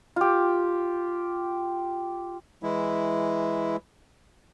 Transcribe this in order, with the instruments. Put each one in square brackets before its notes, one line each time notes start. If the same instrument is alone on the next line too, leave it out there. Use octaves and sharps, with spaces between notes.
[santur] F4 G4
[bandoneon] E3 G#3 E4